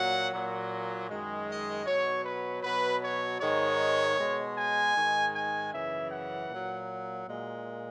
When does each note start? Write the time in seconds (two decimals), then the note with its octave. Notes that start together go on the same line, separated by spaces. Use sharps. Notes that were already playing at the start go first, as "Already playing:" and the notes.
Already playing: A#2 F#3 F#5
0.32 A#2 F#3
1.09 F#2 D#3 G#3
1.48 D#5
1.86 B2 F#3 C#5
2.24 B4
2.63 B2 F#3 B4
3.02 C#5
3.40 G#2 D#3 G#3 C#5
4.18 B2 G#3
4.56 G#5
4.94 G#2 D#3 G#3
5.34 G#5
5.72 F#2 C#3 E3 E5
6.10 F#5
6.49 A#2 F#3
7.26 A#2 G#3